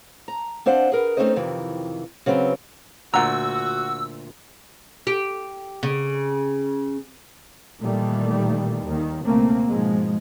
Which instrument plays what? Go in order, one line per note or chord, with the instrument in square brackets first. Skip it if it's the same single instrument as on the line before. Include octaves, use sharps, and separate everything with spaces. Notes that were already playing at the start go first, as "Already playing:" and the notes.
[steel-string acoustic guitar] A#5
C4 D4 C5 F5 F#5
G#4 A#4 B4
A3 C4 C#4 D#4 C5 D#5
F2 C3 D#3 E3
C#3 F#3 B3 C4
[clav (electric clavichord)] D2 A#2 [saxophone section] F#4 [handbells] F#5 A#5 [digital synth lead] E6
[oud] G4
C#3
[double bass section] A#2 D#3 E3 G3 A3
D#2 D#3
C#2 B2 A3 A#3 C4
G#2 B2 F3 G#3